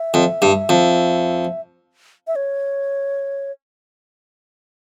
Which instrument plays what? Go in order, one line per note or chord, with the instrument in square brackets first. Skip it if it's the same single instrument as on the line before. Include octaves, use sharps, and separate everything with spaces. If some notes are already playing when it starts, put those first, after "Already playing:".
Already playing: [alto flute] E5
[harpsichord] F2
G2
F2
[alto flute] E5
C#5